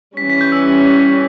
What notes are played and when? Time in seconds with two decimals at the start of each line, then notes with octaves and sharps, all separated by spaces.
0.17 E3 G3 C#4 B6
0.30 B6
0.41 G6
0.52 E6